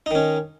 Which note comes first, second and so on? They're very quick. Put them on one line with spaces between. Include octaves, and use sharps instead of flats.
D#4 D#3 C#4